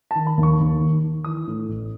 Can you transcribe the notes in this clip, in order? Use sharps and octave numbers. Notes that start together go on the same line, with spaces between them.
A5
D#3
B5
D#2
C#6
D#2
D#3
D#3
E3 D#6
A2
A1